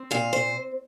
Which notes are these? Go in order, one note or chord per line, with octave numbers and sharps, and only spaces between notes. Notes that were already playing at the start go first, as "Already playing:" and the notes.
Already playing: C4
A#2 F5
C5